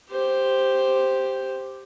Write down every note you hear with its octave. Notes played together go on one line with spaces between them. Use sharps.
G4 C5